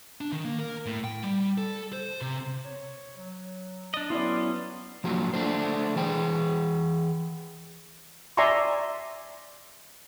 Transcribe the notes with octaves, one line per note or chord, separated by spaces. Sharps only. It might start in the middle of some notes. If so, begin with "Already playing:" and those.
D4
D#3
A#3
A#4
A2
G5
G3
A4
C5
C3
C#5
F#3
D4 D5 D#5
F#3 B3 C#4 E4 D5 C6
F3 F#3 A#3 D#4 F4
A3 D4 C5
E3 G#4 G5
D5 E5 G#5 A#5 C6 C#6